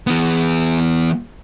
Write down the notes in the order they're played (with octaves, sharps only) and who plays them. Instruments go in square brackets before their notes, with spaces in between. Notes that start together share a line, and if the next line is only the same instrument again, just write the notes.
[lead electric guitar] E3 B3